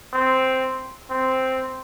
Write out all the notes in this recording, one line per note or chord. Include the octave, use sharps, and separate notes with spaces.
C4
C4